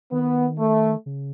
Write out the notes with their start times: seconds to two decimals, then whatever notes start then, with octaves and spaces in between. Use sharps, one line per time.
0.12 D#3 B3
0.59 A3
1.06 C#3